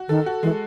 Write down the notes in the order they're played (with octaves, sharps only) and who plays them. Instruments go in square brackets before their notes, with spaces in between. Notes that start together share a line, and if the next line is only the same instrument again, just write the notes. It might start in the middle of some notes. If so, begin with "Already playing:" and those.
Already playing: [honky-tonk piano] F#4
[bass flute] D#3 [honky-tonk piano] A4
[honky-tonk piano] F#4
[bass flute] E3 [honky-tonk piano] G#3